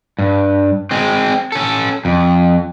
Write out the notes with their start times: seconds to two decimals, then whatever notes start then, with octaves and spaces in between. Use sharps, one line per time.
0.19 G2
0.91 G#3 C4
1.52 C#4 A4
2.05 F2